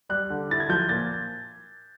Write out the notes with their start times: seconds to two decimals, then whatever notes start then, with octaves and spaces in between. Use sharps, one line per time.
0.09 G3 F#6
0.30 D3
0.50 E4 A6
0.60 G#6
0.69 F3 G6
0.89 A#2 A6